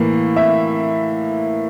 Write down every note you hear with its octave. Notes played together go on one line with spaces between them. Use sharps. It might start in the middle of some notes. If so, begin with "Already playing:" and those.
Already playing: A2 E3 A#3
E5